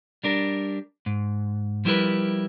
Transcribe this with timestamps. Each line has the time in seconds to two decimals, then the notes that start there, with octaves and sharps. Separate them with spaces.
0.24 G3 D4 A#4
1.06 G#2
1.85 F3 G3 E4 F4 A#4 B4